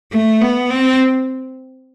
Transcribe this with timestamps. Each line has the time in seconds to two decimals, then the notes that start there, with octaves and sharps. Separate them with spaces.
0.12 A3
0.41 B3
0.70 C4